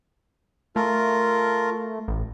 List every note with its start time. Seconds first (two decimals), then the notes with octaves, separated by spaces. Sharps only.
0.76 A3 F4 A#4
2.08 A1